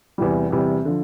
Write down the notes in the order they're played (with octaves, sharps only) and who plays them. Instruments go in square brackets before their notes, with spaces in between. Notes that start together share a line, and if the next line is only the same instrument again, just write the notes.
[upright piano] E2 C3 E3 G3
E2 C3 E3 G3
D3 F3